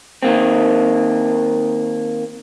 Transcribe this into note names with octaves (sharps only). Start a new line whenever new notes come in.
D#3 A#3 C4